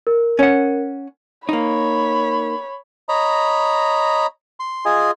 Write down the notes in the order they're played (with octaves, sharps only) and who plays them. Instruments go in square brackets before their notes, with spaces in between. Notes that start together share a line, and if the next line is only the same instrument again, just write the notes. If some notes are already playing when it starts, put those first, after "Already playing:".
[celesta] A#4
[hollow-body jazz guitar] C#4 F#5
[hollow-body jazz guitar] A#3 D#4 [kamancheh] C#5 B5
[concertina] C#5 D#5 A#5 B5
C6
F4 G#4 D#5 G#5